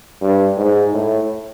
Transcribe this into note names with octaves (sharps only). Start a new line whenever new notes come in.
G2
G#2
A2